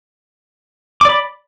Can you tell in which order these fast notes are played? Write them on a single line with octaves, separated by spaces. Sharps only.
D6 D5 B5